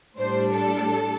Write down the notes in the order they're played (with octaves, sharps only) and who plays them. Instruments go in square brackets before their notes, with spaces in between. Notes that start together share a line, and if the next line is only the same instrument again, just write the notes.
[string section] A2 G3 D4 C5
A4